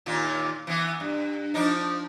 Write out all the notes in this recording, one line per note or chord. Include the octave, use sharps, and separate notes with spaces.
D#2 A#2 F4
E3 B3
G2
F3 D4 D#4